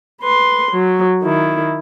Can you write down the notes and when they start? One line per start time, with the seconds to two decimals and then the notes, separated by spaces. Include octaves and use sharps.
0.21 B4 C6
0.72 F#3
1.23 D#3 E4